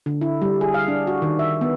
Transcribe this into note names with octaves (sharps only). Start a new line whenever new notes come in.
D3
E4
G3
G#4
F5
D4
F#4
D#3
E5
B3